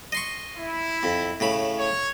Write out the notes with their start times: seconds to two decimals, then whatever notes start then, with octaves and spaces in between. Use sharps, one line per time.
0.12 D#5 C6 C#6
0.56 E4
1.03 F2
1.40 A2 C#3 B5
1.78 C#5